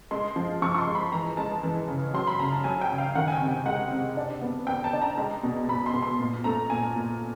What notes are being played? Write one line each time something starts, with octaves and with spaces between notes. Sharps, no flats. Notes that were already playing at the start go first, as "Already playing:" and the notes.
G#3 C6
F3
F3 C#6
C#6
C6
G#3
B5
E3 A#5
G#3 A5
E3
C#3
F#3 C6
B5
C#3 A#5
A5
F#3 G#5
G5
C#3
F5
D#3 F#5
G#5
G5
C3
G#5
G#3 F#5
C3
D4
B3
B3 G5
A5
D4
A#5
G#3 A#5
B2
B2 B5
C6
B2
C6
A#2
A3 A#5
A#2 G#5
A#2